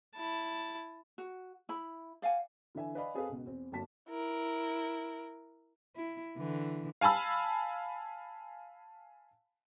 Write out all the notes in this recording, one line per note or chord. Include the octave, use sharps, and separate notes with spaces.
E4 A5
F#4
E4 B5
D5 F5 F#5 G#5
D3 E3 E5 G#5
B4 D5 D#5 F5 G#5 B5
C4 G#4 A4 B4 F5
C#2 B2
E2 C4
G1 F#3 A#3 A5 B6
E4 A#4
E4
D3 E3
F5 G#5 A5 B5 E6